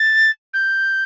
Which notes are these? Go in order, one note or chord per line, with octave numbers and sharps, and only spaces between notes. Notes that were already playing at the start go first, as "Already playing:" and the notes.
Already playing: A6
G6